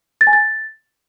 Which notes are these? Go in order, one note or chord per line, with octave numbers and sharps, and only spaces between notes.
A6
G#5
A6